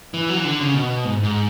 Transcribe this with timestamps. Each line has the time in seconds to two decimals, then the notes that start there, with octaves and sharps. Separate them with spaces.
0.14 E3
0.29 F#3
0.37 E3
0.45 D3
0.60 C#3
0.75 B2
1.05 G#2
1.23 G#2